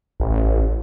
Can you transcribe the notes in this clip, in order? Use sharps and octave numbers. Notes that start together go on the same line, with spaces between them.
A1